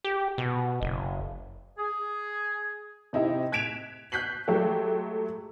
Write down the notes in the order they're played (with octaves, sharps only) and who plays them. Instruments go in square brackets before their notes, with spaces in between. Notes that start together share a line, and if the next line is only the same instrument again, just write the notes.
[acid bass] G4
B2
F#1
[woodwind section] G#4
[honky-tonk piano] C3 D#4 E4 G4
F#6 G#6 B6 D7 E7 F7
F#6 G6 B6 C7 F#7
F#3 G#3 A3 G4